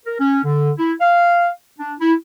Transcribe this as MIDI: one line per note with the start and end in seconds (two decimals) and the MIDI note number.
0.06 0.16 70
0.20 0.40 61
0.44 0.71 50
0.78 0.93 64
1.01 1.49 77
1.79 1.94 62
2.00 2.14 64